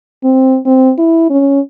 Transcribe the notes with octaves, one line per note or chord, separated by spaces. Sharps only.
C4
C4
E4
C#4